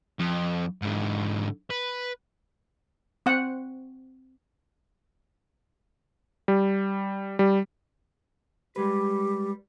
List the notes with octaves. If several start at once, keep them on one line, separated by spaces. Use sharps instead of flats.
F2
G#2 D3
B4
C4 F#5
G3
G3
G3 G#3 G4 B4